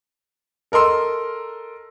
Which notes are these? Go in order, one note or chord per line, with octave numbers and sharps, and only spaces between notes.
A4 A#4 D#5 C6 E6